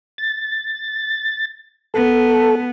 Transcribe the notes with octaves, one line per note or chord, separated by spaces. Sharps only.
A6
B3 A4